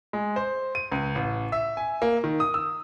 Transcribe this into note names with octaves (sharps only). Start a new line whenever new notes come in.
G#3
C5
D#7
C#2
A1
E5
G#5
A#3
D#3
D#6
E6